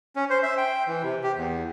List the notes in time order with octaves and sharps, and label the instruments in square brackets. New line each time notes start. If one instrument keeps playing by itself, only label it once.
[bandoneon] C#4
C5
E5
G5
E3
C3
G4
E2